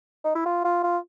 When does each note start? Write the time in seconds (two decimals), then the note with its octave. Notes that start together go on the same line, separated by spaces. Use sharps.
0.24 D#4
0.35 E4
0.46 F4
0.65 F4
0.83 F4